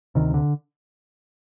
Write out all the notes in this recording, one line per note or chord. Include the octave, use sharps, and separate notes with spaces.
D2 C3 D#3
D3